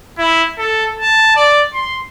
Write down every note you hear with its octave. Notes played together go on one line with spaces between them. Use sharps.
E4
A4
A5
D5
C6